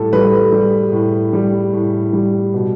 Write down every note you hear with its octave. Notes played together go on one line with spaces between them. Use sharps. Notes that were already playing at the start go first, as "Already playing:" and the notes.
Already playing: A2 G3 A4
G3 B4
G3
A2
G3
A2
G3
B2